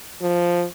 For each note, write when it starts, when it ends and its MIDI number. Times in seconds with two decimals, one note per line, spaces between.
0.21 0.65 53